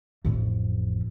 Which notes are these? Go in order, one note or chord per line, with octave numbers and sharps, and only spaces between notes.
A1 F2